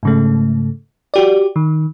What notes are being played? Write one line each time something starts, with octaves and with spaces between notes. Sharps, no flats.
G#2 C#3 A3
F#4 G4 D5
D#3